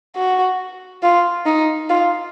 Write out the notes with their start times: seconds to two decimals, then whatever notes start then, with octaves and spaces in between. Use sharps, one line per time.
0.16 F#4
1.03 F4
1.46 D#4
1.89 F4